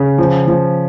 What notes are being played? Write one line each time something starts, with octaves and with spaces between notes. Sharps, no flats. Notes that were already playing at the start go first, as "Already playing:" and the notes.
Already playing: C#3
F3
F3